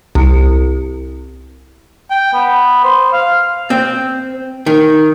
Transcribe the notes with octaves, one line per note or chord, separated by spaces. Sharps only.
C2
G5
B3
C5
F5
C4
D#3